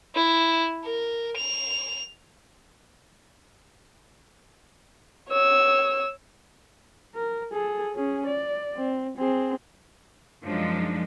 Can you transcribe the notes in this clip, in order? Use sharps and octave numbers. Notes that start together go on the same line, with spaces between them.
E4
A#4
F7
C#5 E6
A#4
G#4 A4
C#4 G#4
D5
C4
C4 G#4
F#2 F3 F#3 G#3 D4 D#4